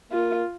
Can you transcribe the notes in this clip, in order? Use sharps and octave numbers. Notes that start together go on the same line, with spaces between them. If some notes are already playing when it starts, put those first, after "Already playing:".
A#3 F4